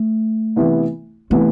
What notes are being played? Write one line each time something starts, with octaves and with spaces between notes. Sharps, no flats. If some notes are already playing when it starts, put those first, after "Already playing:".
Already playing: A3
C3 E3 B3 E4
C3 E3 A3 B3 E4